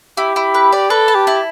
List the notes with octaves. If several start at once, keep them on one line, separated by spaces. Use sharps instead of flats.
E4 G4
E4
B4
D5
A4 B4
A5
G4
E4